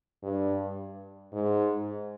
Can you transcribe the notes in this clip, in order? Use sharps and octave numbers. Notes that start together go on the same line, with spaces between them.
G2
G#2